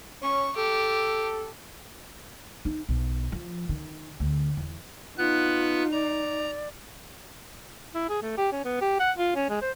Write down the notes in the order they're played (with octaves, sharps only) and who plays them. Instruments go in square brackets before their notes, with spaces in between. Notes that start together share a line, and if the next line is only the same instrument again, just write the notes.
[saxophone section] C#4 [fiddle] C#6
[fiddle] G4 [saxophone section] A4
[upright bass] D#4
B1
F3
D#3
D2
E2
[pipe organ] B3 B4 F#6 [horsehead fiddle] D#4 [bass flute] F4
[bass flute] D5 [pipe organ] A#5
[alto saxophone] E4
G#4
A3
G4
C#4
B3
G4
F#5
F4
C#4
G#3
C5